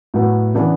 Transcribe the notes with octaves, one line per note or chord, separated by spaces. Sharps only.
A2 F#3 B3
C#3 E3 B3 D4